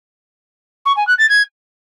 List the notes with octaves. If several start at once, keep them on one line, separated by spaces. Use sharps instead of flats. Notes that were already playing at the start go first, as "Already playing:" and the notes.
C#6
G#5
F#6
A6
G#6